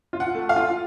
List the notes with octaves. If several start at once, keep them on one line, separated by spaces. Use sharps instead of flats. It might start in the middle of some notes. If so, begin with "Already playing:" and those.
F4
F#5
A3
F5
F4